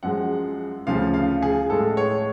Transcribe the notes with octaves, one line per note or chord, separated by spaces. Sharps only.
F#2 F3 G#3 F#5
D2 C#3 F3 F5
F5
G#4
A2 G#3 A4
C#5